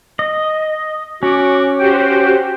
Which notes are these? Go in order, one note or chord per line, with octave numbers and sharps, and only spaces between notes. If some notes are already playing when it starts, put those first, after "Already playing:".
D#5
C#4 F#4 D6
F#4 G4 C5 G5